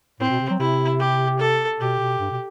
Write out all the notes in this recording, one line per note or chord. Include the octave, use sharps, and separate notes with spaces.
A2 C4
B2
C3
F#3
C3 E4
G4
A4
B2 G4
B2
G2
B2